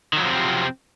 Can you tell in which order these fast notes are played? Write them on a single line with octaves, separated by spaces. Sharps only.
D#3 F#3 F3 C3 C4